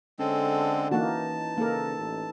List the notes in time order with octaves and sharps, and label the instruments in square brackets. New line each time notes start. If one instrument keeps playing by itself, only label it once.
[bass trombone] D3 [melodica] G#3 C4 A4 [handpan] C#4
[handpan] E3 D#4 [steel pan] A#3 F#4 [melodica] A5
[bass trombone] C#3 [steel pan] A#3 A#4 [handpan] D#4 A4
[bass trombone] A1